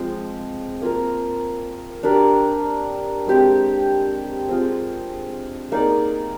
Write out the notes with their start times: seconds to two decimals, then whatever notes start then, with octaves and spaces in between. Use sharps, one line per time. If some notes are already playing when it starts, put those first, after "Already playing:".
Already playing: F3 G#3 C4
0.81 A#3 F4 A#4
2.03 D4 G4 A#4 D5
3.27 G#3 C4 G4
4.49 C4 F4 G#4
5.72 A#3 D#4 G#4 D5